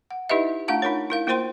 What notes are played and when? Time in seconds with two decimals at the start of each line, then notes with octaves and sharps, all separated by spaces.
0.11 F#5
0.30 D#4 E4 G4 B4 D#5 E5
0.68 A3 D4 F4 F5 F#5 A5
0.82 D#4 F4 A#4 C#5
1.10 E4 A#4 F5
1.27 A#3 F4 A#4 C5 G5 C6